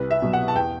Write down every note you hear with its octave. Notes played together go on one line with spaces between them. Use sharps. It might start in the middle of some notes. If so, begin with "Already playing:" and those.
Already playing: C2 B4
E5
B2 F#3
F#5
A5
E2 G5